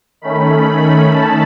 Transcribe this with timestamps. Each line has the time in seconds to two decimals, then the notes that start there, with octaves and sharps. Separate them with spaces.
0.21 D#3 A3 C#4 B5
1.11 A5